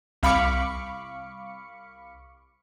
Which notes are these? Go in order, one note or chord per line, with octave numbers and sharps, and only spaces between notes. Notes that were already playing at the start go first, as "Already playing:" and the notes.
C2 F5 B5 C#6 D6 C#7